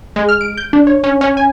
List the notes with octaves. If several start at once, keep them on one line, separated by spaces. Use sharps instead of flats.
G#3
F6
D7
G6
D4
C#5
C#4
C#4
G#5